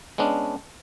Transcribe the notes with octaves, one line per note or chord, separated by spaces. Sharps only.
G#3 B3 C#4 D4